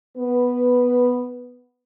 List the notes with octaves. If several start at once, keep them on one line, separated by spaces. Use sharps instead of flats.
B3 B4